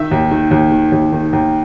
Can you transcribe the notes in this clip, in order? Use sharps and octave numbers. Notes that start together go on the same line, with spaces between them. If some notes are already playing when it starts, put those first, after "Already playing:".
Already playing: D#3 E5
D#2
D#3
D#2
D#3
D#2
D#3
D#2